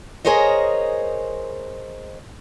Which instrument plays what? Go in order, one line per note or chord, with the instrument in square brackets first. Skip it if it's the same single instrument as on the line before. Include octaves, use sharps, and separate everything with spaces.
[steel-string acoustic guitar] G#4 A#4 C5 C#5 D#5